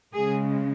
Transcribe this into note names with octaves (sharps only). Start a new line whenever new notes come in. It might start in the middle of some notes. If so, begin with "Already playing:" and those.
C#3 G#3 G#4